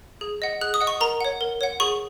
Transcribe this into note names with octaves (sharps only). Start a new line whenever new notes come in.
G#4
D#5 F#5
G#4 F#6
D#6
D#5 F#5
C#6
A#4 A#5
C#5 F#5
A#4
C#5 F#5
G#4 C#6